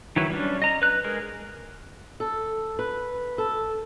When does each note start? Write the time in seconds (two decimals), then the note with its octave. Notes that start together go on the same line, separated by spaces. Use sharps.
0.16 D#3 E3 F#3 E4 B4
0.30 G3 C#4 D4
0.62 D#5 A#5
0.82 B4 F#6
1.04 G#3 G#4 A#4
2.20 A4
2.79 B4
3.38 A4